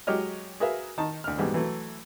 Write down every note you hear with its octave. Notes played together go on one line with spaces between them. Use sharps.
F#3 G#3 G4 C#5 D#5 F6
F#4 G#4 A#4 B4 E5 F5
D#3 D#4 A5
D2 F6
G#2 B2 E3 G3 G#3
E3 F#3 A3